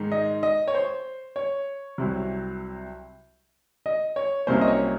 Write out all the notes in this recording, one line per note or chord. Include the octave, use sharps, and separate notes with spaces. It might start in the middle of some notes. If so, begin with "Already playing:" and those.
Already playing: G#2 D#3 G#3 D#4
D#5
D#5
C#5
C5
C#5
C2 C3 F#3
D#5
C#5
C2 C3 F#3 A#3 C#4 C5
D#5
C#5